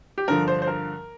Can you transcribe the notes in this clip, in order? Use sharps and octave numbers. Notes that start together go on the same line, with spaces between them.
G4
G2 D3 F3 A#4
C5
C5
A#4